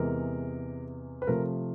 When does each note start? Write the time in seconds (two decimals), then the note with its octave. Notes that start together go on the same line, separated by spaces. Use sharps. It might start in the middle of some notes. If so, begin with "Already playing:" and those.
Already playing: E2 C3 E3 G#3 A#4
1.22 B4
1.27 C3 F3 A3 A#4